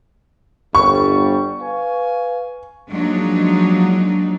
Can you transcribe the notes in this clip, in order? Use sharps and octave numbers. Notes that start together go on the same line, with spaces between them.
G1 G3 C#6
B4 F5 G#5
F3 F#3 G#3 A#3 D4 D#4